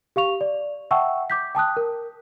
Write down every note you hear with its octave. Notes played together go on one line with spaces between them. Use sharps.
G4 F5 C#6 F7
D5
E5 F#5 G5 A5 C#6 E6
D6 G6 B6
G5 A5 D#6 F#6
A#4